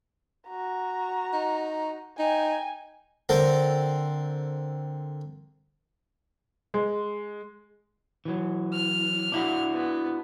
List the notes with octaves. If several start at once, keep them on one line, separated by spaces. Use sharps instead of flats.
F#4 A#5
D#4
D#4 G5 G#5
D3 C4 A4 A#4 C5
G#3
E3 F#3
F6
D4 E4 F#4
B3